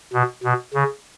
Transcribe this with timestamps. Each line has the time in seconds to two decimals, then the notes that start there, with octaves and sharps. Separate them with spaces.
0.13 B2
0.44 B2
0.74 C#3